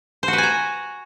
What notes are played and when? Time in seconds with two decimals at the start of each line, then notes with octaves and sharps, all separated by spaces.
0.23 C5
0.28 F#4
0.33 B4
0.38 G#5
0.43 A#5